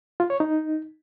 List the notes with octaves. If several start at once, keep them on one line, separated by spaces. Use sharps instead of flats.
F4
C#5
D#4